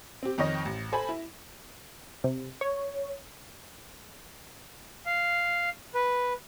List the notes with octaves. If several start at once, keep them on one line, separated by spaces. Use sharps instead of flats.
C4 G4
F2 D#3 C#5 D#5 A#6
A1
A4 C5 G#5 B5
E4
C3
C#5
F5
B4